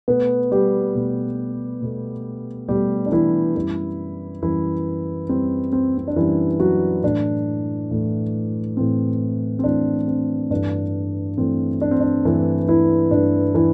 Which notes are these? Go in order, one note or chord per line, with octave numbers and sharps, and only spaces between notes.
B2 A3 B3 B4
G3 G4
B2 A3
B2 A3
B2 G3 A3 G4
D4
E3 E4
F#2 E3 G3
F#2 E3 G3 E4
F#2 E3 G3 C4
C4
C4
D4
F#2 E3 G3 E4
F#3 F#4
A2 E3 A3 D4
A2 E3 A3
A2 E3 A3 C4
C4
A2 E3 A3 D4
C4
G2 E3 A3 D4
G2 E3 A3 C4
D4
C4
D4
G2 E3 A3 E4
E3 E4
G2 E3 A3 D4
E3 E4